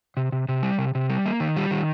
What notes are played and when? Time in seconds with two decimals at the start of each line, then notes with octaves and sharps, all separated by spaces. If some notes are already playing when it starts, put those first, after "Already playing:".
0.17 C3
0.32 C3
0.49 C3
0.63 G3
0.78 C3
0.95 C3
1.10 G3
1.26 A#3
1.40 D#3
1.56 G3
1.71 D#3